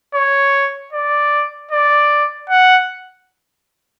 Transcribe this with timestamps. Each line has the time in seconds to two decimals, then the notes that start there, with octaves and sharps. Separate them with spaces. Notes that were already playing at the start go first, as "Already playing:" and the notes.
0.15 C#5
0.93 D5
1.71 D5
2.50 F#5